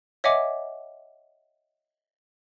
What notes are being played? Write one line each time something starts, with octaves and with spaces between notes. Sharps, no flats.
C#5 D#5 E5 F#5 G#5 D6